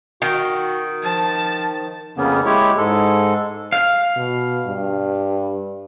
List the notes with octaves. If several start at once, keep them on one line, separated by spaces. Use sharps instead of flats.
D#3 F#4
F3 A5
F2 C#3 A#3 B3 C#4
G#3 E4 G4 C#5
G#2 G#3 A4
F5
B2
G2